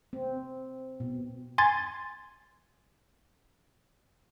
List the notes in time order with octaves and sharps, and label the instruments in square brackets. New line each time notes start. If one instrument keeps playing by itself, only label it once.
[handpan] C4
B2
[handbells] G#5 C6 G#6 A6